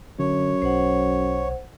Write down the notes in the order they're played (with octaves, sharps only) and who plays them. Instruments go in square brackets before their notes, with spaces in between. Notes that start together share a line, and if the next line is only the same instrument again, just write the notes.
[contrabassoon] F#2 [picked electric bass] D3 [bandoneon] C#5
[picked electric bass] B1 [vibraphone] C5 F#5